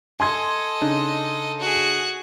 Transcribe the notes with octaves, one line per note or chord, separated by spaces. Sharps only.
A4 D#5 G#5 C6 G#6
C#3 D4 D#4
F#4 G#4